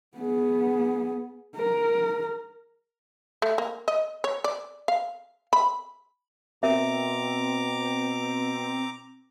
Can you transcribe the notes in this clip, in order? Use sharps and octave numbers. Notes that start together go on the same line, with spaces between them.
B3 G#4
A#4
A3
A#3
D#5
C#5
D5
F5
B5
B2 C4 A#4 E5 A#5 D6